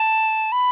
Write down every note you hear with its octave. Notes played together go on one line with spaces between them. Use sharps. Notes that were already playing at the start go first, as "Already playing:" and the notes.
Already playing: A5
B5